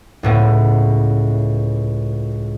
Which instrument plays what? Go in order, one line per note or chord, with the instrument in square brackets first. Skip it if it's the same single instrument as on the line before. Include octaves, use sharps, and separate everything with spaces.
[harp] C#2 A2 B3